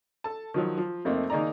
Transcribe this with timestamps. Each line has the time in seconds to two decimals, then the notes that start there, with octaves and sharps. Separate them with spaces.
0.24 A4 A5
0.54 D#3 F3 F#3
0.77 F3
1.05 F2 A3 A#3 C4 D#4
1.30 D#3 A#3 D#4 G#4 D5 A#5